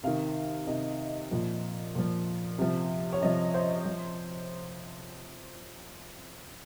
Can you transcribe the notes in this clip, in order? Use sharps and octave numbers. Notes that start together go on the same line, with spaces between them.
C3 D#3 F5
C3 D#3 D#5
A#2 F3
A#2 F3
C3 F3
C#5
C3 F3 D#5
C5
F3